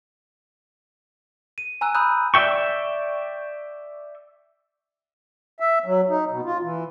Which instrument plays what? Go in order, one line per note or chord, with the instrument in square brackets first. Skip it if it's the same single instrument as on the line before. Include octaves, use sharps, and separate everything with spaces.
[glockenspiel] D#7
G#5 A#5 E6 F#6
A#5 B5 D#6 E6 F#6 G6
[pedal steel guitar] D5 E5 G5 C#6
[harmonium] E5
F#3
D#4
B2
F4
E3